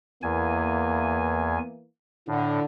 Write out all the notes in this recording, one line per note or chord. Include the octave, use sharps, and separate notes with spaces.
E2 E3 A#3 G#5
A2 D3